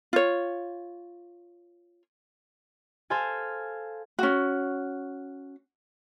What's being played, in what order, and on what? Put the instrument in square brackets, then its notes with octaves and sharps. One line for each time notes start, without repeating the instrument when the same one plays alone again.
[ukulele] F4 C#5
[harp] A4 C5 F5 G#5
[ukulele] C#4 F#4